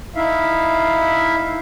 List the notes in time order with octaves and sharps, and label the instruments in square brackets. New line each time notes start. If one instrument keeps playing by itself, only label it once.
[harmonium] D#4 E4 E5 F5